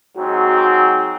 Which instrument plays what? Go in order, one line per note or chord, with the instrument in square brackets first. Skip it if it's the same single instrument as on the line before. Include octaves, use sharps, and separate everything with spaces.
[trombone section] G#2 F#3 C4 [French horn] F#4